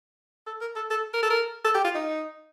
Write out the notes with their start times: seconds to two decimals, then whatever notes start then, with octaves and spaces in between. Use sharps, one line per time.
0.47 A4
0.61 A#4
0.76 A4
0.91 A4
1.14 A#4
1.23 A4
1.30 A#4
1.65 A4
1.75 G4
1.85 F4
1.95 D#4